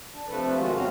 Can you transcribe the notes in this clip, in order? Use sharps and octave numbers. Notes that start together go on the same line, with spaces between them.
D4
C3 F3 A3 D4 A4 B4
B2 D#3 G#3 F4 F#4
F2 C#3 C4 C#4 F#4 F5